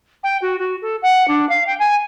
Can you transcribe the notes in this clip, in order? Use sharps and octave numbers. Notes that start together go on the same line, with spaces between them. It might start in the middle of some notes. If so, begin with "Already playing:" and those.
G5
F#4
F#4
A4
F#5
D4
F5
G5
G#5